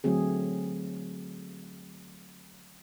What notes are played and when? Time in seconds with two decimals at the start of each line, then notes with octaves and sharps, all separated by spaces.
0.04 D3 F#3 A3 C4 G#4